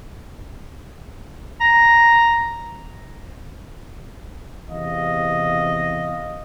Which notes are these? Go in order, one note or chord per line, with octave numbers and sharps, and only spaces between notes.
A#5
E2 C3 D#5 F5